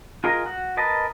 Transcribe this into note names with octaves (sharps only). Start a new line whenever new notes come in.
F4 G#4 A#4 D#5
F#4
A#4 B4 D#5 A5